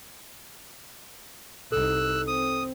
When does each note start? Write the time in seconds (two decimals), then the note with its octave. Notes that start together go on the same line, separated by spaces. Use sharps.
1.72 C2 D#4 A4 E6 F#6
2.27 C4 D#6